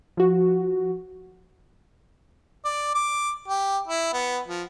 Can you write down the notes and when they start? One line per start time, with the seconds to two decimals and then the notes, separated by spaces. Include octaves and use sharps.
0.17 F3 F#4
2.65 D5
2.94 D6
3.48 G4
3.87 E4
4.13 B3
4.47 F3